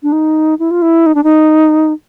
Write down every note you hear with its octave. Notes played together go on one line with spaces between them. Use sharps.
D4
D#4
E4
F4
E4
D#4
D4
D#4